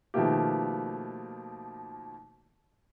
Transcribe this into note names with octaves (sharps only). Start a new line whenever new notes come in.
B2 D#3 F3 A3 A#3 G4